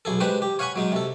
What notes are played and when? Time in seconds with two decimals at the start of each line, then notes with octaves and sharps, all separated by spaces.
0.05 B1 G#4 A4
0.20 G3 G#3 D4 B4 C5 G5
0.42 G4
0.59 C#5 F5 F#5 G#5 B5 C#6
0.76 F#3 G#3 D#4
0.92 C3 A4